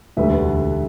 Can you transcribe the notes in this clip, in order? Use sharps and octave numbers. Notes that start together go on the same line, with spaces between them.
E1 D2 D3 G3 B4 E5